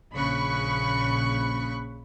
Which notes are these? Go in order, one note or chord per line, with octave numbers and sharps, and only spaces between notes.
A#1 C#3 B5 C#6 F#6